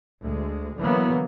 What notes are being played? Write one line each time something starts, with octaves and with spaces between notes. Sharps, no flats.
D2 G#3
D3 E3 F#3 A#3 B3